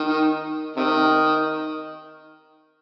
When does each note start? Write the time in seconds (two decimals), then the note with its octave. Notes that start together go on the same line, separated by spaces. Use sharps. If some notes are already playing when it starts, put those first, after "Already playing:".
Already playing: D#3
0.76 C3 D#3